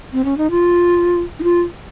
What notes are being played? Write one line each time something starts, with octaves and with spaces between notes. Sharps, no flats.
C4
C#4
D#4
F4
D#4
F4